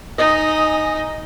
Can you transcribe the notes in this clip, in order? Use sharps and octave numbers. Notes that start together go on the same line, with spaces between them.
D#4 D#5 G#5 D#6